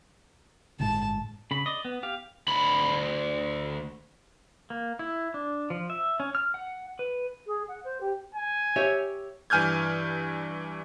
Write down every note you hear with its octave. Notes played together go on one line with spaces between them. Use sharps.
G1 A2 G#3 A5
C#3 B5
D5 D#5
B3
G4 F5
D2 B5
A#3
E4
D4
F3
E5
C#4
F6
F#5
B4
G#4
F#5
C5
G4
G#5
G4 C#5 E5
G2 E3 G#5 F6 G6 G#6